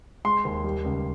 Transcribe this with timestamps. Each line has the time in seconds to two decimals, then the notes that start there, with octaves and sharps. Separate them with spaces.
0.25 G#3 C6
0.45 D#2
0.64 G3
0.85 C#2